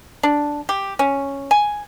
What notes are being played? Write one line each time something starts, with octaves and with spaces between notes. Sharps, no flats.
D4
G4
C#4
G#5